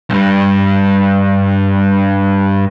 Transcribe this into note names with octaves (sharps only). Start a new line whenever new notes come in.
B1 G2